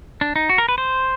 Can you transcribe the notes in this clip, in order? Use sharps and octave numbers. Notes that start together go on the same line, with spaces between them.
D4
D#4
F#4
A#4
B4
C5